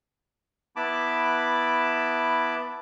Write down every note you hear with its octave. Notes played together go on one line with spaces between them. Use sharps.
B3 E4 A5 B5 D6